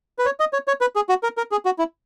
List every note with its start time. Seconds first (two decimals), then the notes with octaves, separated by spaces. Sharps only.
0.19 B4
0.25 C#5
0.40 D#5
0.53 C#5
0.67 C#5
0.81 B4
0.96 G#4
1.09 F#4
1.23 A#4
1.37 A#4
1.52 G#4
1.65 F#4
1.79 E4